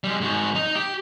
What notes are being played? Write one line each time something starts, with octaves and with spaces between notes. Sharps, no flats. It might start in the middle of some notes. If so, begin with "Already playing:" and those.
G3 G#3
G#2 F#4
D#4
G4